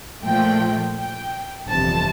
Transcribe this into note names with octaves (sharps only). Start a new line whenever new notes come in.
A#2 F3 A3 G5
G5
G1 F2 C3 E3 A5